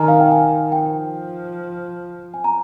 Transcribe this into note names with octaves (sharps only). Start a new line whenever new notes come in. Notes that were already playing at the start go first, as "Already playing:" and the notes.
Already playing: D#3 G#5 A#5
F5
G5
G#5
F3 G5
G#5
A#5